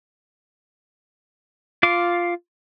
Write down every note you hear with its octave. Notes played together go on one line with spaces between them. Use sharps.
F4 F5 D6